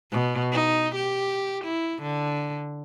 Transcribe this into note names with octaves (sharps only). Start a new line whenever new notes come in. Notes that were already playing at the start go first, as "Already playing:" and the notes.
B2
D#4
G4
E4
D3